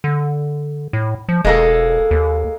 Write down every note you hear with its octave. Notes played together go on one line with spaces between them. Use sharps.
D3
A2
F3
E1 G#3 A#3 A4
D#2